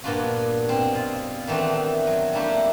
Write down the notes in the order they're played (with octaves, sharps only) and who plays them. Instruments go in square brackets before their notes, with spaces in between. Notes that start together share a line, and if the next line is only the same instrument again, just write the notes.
[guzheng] G2 A#2 B3 D4 F4 F#4
B2 C4
F4
D#3 E3 A3 B3 C4 D4
F#3
G3 A3 A#3 D4 E4 G4